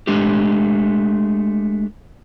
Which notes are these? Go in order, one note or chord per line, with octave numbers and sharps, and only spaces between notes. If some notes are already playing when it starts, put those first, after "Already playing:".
G#3 A3 D4 G4